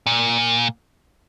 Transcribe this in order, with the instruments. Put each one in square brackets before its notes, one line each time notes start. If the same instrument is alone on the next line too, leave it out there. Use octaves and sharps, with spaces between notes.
[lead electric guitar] A#2